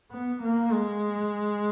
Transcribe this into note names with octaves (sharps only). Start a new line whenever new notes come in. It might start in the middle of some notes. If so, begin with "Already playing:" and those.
B3
A#3
G#3